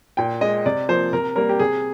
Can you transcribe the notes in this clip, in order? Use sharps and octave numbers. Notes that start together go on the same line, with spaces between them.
A#2 G5
G#3 D#5
C3 D5
F3 A#3 C5
C3 A#4
G3 A#3 A#4
G4
C3 G#4